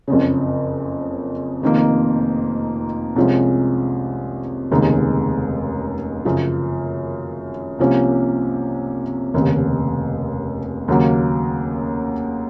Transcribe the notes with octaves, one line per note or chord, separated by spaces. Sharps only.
F#1 F2 C#3
F1 F2 D#3 A#3
C2 C3 F3 G#3 C#4
F1 D#2 C#3 G#3 D#4
F#2 C#3 F3
C2 C3 F3 A#3 C#4
F1 D#2 C#3
D#2 C#3 F#3 A#3